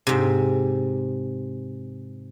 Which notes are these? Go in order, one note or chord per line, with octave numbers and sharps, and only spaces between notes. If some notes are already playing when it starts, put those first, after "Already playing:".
G#2 C3